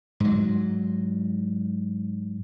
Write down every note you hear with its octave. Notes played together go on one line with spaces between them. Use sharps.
G#2 F#3